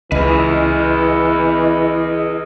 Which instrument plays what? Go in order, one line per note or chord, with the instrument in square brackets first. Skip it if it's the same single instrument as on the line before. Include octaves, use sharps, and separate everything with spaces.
[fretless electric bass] C#2 [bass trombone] E3 [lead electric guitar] G#4 B4 [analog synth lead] D#5